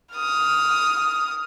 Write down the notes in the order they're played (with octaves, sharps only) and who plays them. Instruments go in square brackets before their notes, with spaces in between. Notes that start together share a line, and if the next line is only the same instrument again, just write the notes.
[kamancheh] D#6 F6